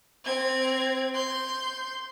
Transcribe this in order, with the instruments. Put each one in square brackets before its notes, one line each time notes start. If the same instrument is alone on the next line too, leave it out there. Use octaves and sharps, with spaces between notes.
[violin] C4 G#6
C6 G6